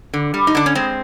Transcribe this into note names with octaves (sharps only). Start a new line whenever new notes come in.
D3
G3
D#4
D3 D4
C#4
G#3 C4